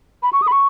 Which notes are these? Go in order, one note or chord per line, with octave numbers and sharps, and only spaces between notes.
B5
C#6
D#6
B5
C#6